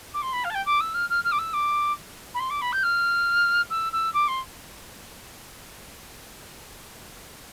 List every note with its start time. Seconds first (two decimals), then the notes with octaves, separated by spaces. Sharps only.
0.14 D6
0.22 C6
0.33 B5
0.44 F5
0.50 A5
0.55 G5
0.66 D6
0.81 E6
0.94 F6
1.10 F6
1.24 F6
1.32 D6
1.39 E6
1.54 D6
2.34 B5
2.40 C6
2.50 D6
2.62 B5
2.73 G6
2.83 F6
3.70 E6
3.93 E6
4.14 D6
4.28 C6